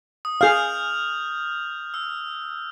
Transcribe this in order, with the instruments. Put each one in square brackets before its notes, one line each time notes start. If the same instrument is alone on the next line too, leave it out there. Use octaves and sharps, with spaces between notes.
[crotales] D#6
[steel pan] G#4 F5 [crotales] F6 G6 F7
[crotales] E6